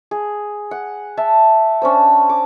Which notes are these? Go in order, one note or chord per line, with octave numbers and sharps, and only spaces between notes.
G#4
F#5
E5 A5
C#4 D4 C5
D6